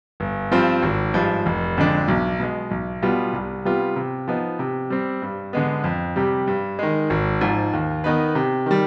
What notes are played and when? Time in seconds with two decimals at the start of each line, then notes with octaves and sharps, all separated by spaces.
0.20 G1
0.51 G2 F3 C4 F4
0.83 G#1
1.14 G2 F3 G#3
1.46 F1
1.77 F2 D3 G#3 D4
2.08 B1
2.40 B2 G#3
2.71 B1
3.03 B2 G3 B3 F4
3.33 C2
3.65 C3 G3 B3 F4
3.96 C3
4.28 F3 B3 D#4
4.59 C3
4.90 G3 C4
5.22 G2
5.53 D3 G#3 B3
5.84 F2
6.16 C3 G3
6.48 G2
6.79 D#3 G#3
7.10 G#1
7.41 G#2 F3
7.73 D#2
8.04 D#3 B3 D#4 B4
8.35 C3
8.66 D#3 G3